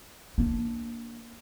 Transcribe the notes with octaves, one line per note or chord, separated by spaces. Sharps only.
A#3 D4